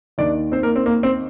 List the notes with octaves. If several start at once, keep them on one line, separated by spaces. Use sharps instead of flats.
D#2 D#3 D4 D5
C4 C5
A#3 A#4
C4
A#3
C4